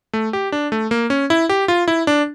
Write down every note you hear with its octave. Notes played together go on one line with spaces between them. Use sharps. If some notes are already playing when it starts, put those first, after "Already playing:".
A3
G4
D4
A3
A#3
C#4
E4
G4
F4
E4
D4